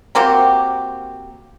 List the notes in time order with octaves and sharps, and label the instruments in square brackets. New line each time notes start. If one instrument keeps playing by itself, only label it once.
[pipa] A#3 C4 F#4 G4